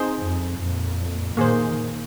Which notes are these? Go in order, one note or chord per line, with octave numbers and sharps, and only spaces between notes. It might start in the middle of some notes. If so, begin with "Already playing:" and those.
Already playing: C4 D#4 G#4 C5
F2
F2 A#2
A#2 D#3 A#3 G#4 C5